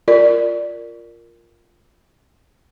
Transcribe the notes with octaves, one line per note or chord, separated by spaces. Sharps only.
F4 A#4 D5